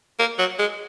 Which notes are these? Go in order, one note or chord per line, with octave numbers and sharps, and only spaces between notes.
A#3
F#3
G#3